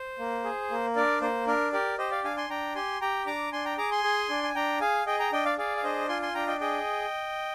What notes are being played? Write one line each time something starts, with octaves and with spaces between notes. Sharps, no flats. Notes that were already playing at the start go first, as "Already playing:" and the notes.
Already playing: C5
A#3
G#4
A#3
D4 A#4 D5
A#3 C5
D4 A#4
G4 A#4 D5
G4 C5 D#5
D5 F5
D4 F5 G#5
G#5 C6
D4 G5 A#5
G4 G#5 C6
G4 G5 A#5
D4 A#5 D6
D4 G#5 C6
G5 A#5
G#4 A#5 D6
G#5 C6
G#4
D4
G#5
D4 G5 A#5
G#4 F5 G#5
G#4 D#5 G5
G5 A#5
D4 D#5 G5
D5 F5
G#4 D5 F5
F5
D4 C5 D#5
F4 G#5 C6
G#5 C6
D4 G5 A#5
D#5 G5
G#4 D#5 G5